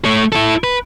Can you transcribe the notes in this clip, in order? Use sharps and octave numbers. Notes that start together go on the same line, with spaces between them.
A3 C#5
E4 A4
B4